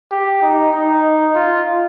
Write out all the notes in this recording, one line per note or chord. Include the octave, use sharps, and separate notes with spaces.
G4
D#4
D#4
F4